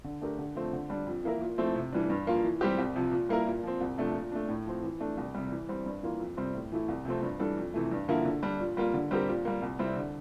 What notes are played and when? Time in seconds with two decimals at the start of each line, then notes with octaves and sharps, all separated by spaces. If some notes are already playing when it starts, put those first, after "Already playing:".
0.04 D3
0.21 A3 D4 G4 A#4
0.39 D3
0.55 F3 A3 C4
0.73 D3
0.90 G3 D4
1.07 F2
1.24 E3 A#3 E4 A#4
1.41 A#2
1.58 F3 A3 C4 E4
1.75 C3
1.93 E3 G3 D4
2.10 G2
2.27 F3 A#3 F4
2.43 E3
2.61 G3 C4 G4
2.78 C2
2.96 C3 F3
3.12 A#2
3.29 G3 A#3 E4 A#4
3.46 A#2
3.63 F3 C4
3.81 C2
3.98 C3 F3 A3 D4
4.14 A#2
4.32 A3 D4
4.49 A2
4.66 F3 C4
4.84 E3
5.00 A3 D4
5.17 C2
5.35 C3 G3
5.52 E3
5.69 G3 C4
5.86 G2
6.03 E3 A#3 F4
6.20 F2
6.37 C3 G3 C4
6.54 A2
6.72 E3 A3 E4
6.88 C2
7.05 C3 F3 A3 C4
7.22 G2
7.40 E3 G3 D4 A4
7.57 F2
7.74 C3 E3 A3
7.91 G2
8.08 D3 F3 A#3 E4
8.25 D3
8.43 G3 D4
8.60 A#2
8.77 G3 A#3 F4
8.94 D3
9.11 G3 C4 G4 A#4
9.28 A#2
9.45 G3 A#3
9.62 C2
9.79 C3 G3 C4 E4
9.96 D3